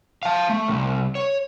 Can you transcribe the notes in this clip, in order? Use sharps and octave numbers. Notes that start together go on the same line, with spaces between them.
F5 A5
A3
C2
C#5